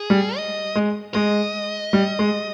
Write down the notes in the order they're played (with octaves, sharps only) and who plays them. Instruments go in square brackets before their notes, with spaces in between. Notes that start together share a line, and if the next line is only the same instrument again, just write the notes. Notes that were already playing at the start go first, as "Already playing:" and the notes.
Already playing: [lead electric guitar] G#4
[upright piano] G3
[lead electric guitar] D#5
[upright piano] G#3
[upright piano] G#3 [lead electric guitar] D#5
[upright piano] G3
G#3